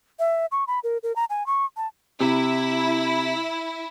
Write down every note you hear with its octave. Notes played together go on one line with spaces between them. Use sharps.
E5
C#6
B5
A#4
A#4
A#5
G#5
C#6
A5
C3 E4